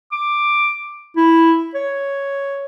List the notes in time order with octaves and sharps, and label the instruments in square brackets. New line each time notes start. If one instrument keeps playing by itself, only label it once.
[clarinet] D6
E4
C#5